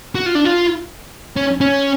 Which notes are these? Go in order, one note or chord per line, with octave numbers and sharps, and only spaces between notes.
F#4
F4
D4
F4
C#4
C#4